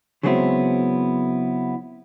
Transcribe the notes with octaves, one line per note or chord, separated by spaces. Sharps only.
C#3 F#3 G#3 B3 C4 E4